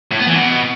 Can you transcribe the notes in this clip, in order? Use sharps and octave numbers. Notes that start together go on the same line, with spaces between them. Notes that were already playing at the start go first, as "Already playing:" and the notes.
A2
B3
E3
B2